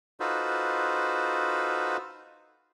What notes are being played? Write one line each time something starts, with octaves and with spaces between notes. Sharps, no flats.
D#4 F4 F#4 A4 B4 C5